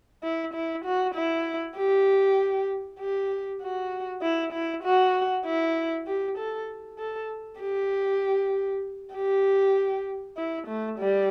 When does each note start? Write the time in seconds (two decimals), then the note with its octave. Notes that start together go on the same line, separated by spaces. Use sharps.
0.23 E4
0.54 E4
0.85 F#4
1.15 E4
1.77 G4
2.99 G4
3.62 F#4
4.22 E4
4.53 E4
4.83 F#4
5.45 E4
6.07 G4
6.38 A4
6.99 A4
7.60 G4
9.14 G4
10.37 E4
10.67 A3
10.99 G3